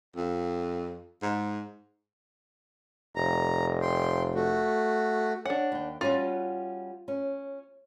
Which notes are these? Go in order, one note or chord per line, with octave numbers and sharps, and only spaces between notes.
F2
G#2
F1 A#5
G5 C6
A3 F#4
D4 C#5 F#5
D#2 G5
G3 C#4 F4 F#4
C#4